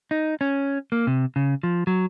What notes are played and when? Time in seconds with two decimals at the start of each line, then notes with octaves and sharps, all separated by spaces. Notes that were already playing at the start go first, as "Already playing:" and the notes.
0.11 D#4
0.41 C#4
0.92 A#3
1.07 C3
1.36 C#3
1.63 F3
1.87 F#3